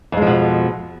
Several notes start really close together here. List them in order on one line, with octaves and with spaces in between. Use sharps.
F2 G#3 F3 B2